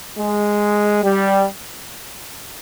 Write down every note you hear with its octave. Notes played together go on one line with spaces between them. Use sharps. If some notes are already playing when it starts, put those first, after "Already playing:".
G#3
G3